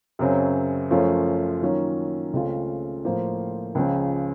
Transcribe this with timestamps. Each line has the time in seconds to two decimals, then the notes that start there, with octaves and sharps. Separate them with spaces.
0.19 F#2 C#3 F#3 C4
0.91 F#2 F3 A3 C#4 F4
1.62 D#3 F#3 A#3 C#4 F4
2.33 C#2 C#3 A3 C4 F4
3.05 A2 F3 A#3 F4 C5
3.75 C#2 C#3 F3